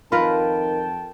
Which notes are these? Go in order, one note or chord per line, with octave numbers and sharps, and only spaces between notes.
F2 D#3 F4 A#4 B4 G5 A5 B5